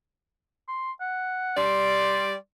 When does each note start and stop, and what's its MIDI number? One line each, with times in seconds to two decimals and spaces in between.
0.68 0.92 84
1.01 1.53 78
1.57 2.35 55
1.57 2.35 74
1.57 2.34 84